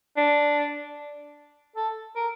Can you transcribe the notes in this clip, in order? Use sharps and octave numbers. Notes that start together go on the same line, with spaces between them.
D4
A4
A#4